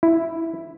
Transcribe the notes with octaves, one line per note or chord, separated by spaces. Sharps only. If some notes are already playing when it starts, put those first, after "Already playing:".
E4